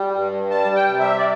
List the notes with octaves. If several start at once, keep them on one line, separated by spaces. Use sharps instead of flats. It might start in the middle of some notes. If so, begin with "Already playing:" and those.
Already playing: G3
G2
G3 A5
G5
C3
E5
D5